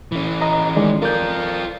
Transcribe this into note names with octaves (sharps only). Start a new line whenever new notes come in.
E3 C#4
D#5 A#5
D#3 G#3 D5
F4 A4 A#4 D5 G6